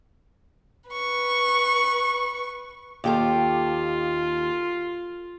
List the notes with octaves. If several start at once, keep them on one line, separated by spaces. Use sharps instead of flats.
B4 C#6
D#2 F4 G4 A4